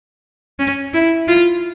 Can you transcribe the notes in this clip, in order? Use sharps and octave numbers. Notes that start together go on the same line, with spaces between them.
C#4
E4
F4